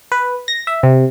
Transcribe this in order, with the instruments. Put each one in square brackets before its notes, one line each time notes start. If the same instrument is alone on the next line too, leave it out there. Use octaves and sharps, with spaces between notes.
[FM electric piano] B4
A#6
E5
C3